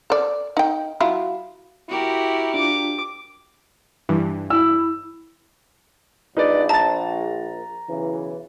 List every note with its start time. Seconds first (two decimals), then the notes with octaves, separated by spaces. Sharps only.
0.10 A4 D5
0.57 D#4 G5
1.00 F#3 E4 F4
1.89 E4 F#4 G4 A#4
2.54 D4 F4 D6
4.09 G2 E3
4.50 E4 E6
6.37 A#1 D#4 B4 D5
6.69 A5 A#5 A6
7.87 B1 C#3 E3